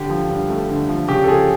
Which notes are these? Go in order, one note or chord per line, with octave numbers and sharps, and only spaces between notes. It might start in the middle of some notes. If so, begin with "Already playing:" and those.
Already playing: D3 G4
F3
G2
A3
D3
F3
C#3 G4
A4
F3 G#4